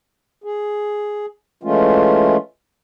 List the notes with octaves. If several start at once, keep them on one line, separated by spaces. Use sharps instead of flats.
G#4
E3 G#3 A3 C#4 F4